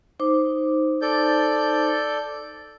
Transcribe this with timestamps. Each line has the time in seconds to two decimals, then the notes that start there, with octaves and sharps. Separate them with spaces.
0.20 D#4 C5 D6
1.02 A4 D5 G6